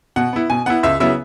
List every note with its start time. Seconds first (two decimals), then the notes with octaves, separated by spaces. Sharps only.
0.16 B2 F#5
0.33 B3 E4
0.50 B2 G#5
0.66 B3 E4 F#5
0.83 C#2 E5
1.00 C#3 F#3 B3 E4 E5